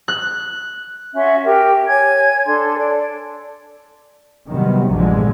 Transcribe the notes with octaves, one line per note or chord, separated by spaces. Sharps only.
F#6
C#4 F#4 E5 C6
G4 A#4
C#5 G#5 G#6
D4 A4 C6
D5
C3 D#3 F#3 G3 B3
A#1 E2 G2 D3 F3 G#3